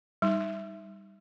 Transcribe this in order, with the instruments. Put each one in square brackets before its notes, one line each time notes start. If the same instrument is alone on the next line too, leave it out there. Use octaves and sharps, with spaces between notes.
[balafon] G3 D#4